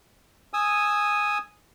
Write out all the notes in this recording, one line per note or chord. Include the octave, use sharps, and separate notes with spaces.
G#5 D#6 E6